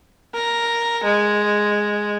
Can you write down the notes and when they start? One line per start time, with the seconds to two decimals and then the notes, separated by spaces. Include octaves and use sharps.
0.35 A#4
1.04 G#3